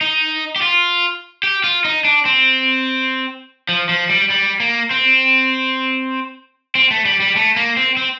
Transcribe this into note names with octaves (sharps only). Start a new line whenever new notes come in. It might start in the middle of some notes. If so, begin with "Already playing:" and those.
D#4
G4
F4
G4
F4
D#4
D4
C4
F3
F3
G3
G3
A#3
C4
C4
A3
G3
G3
A3
A#3
C4
C4